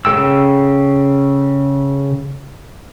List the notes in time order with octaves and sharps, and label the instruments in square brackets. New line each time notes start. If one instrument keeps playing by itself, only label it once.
[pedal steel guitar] C#3 D4 A4 G5 E6